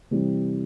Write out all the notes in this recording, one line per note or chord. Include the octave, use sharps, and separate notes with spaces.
C3 E3 G3